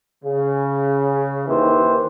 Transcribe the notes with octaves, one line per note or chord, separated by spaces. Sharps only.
C#3
D#2 D#3 E3 C5